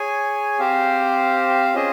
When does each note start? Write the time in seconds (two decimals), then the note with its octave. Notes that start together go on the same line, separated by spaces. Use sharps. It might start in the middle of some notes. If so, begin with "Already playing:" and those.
Already playing: G#4 C#5 G#5
0.59 C4 G4 C5 F5
1.74 C#4 F4 G#4 C5 D#5